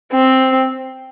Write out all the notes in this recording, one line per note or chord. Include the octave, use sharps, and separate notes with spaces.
C4